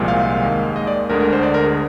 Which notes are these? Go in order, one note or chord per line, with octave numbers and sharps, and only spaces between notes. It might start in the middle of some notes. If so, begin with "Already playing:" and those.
Already playing: C2 A#2 F3 G#3
F5
D#2 D#3 G#3
D#5
D5
D2 D3 G#3 A#4
A#4
C5
D5
A#4
G#4